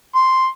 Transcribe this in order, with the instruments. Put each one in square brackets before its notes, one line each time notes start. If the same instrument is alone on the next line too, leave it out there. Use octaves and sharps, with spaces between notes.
[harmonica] C6